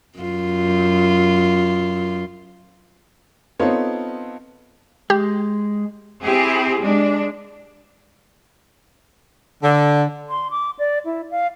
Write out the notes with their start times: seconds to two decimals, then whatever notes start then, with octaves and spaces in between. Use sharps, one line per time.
0.19 F#2 F4
3.59 B3 C4 D#4 F4 A4 C#5
5.10 G#3 G4
6.23 C4 E4 G4 G#4
6.80 G#3 D4
9.62 D3
10.28 C6
10.51 D6
10.79 D5
11.05 E4
11.31 F5